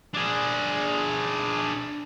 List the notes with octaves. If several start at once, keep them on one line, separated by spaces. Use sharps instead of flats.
D4 G#4